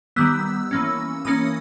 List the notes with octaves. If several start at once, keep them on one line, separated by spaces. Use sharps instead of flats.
D#3 G3 B3 E6
E3 A#3 C#4
E3 A#3 C#4 D#6